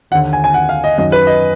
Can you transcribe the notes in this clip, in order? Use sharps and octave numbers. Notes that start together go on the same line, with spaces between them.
D#2 D3 F#5
G#5
G#5
F#5
F5
D#5
F#2 D#3 D#5
B4
D#5